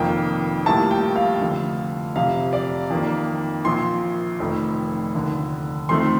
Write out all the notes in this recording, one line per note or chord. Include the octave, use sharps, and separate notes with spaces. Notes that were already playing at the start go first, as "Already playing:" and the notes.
Already playing: F1 F2 D#3 A#3 G5
A#1 A2 G3 A#3 A5
G5
F5
F1 F2 D3 A3
F1 F2 C3 F5
D5
F2 D#3 A#3
A#1 A#2 F3 C6
F1 F2 D#3 A3
F1 D#2 D3
F2 D#3 A3 C4 C6